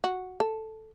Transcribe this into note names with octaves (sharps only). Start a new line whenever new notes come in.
F#4
A4